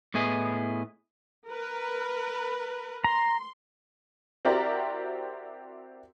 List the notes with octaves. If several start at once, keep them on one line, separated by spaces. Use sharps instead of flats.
A2 B3 E4 G#4 D#5
A#4 B4
A#5 C6
C4 E4 F#4 G4 A#4 D5